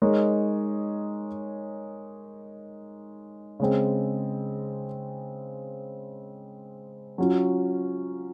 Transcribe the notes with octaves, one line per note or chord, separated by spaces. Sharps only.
G#3 D#4 A#4 C#5
C#3 G#3 C4
F#3 C#4 F4